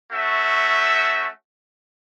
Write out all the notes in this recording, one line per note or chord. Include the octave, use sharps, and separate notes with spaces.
A3 C#4 F#4 E5